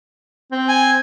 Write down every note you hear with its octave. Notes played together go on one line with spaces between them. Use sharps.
C4
G#5